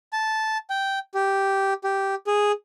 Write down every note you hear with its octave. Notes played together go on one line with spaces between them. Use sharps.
A5
G5
G4
G4
G#4